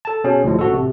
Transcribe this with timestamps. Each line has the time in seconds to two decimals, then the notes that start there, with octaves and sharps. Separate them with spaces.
0.05 A4 A5
0.24 B2 C#4 G#4
0.44 D2 A2 F3 G#3
0.59 A1 F#4 A4
0.73 C3